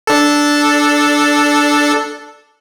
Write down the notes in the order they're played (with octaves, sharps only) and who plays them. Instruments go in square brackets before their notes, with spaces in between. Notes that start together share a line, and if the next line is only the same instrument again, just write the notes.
[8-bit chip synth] D4 A4